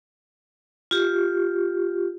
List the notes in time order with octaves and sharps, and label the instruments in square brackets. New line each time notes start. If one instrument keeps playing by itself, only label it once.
[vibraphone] F4 G4